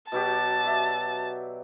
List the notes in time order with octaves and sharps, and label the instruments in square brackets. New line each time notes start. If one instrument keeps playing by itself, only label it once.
[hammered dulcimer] B2 F#3 G4 [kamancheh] A5
[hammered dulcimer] D5 E5